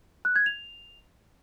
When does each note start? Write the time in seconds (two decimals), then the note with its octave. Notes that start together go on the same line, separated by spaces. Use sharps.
0.25 F#6
0.36 G#6
0.46 F7